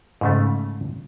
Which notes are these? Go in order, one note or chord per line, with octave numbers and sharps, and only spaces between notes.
G#2 C#3 A3